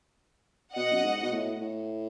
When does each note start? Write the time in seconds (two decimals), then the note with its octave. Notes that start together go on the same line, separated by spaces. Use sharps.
0.75 B2 D#5 F#5
0.92 F#2
1.04 G#2
1.23 B2
1.33 A2
1.62 A2